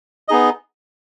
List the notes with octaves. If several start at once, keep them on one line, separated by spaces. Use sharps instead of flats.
B3 D#4 G#4 D#5